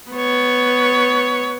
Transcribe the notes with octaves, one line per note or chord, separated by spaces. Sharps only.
B3 C#5